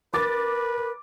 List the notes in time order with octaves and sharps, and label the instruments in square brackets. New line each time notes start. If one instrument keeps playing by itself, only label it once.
[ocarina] A#4 [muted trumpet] B4 [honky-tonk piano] D6 A6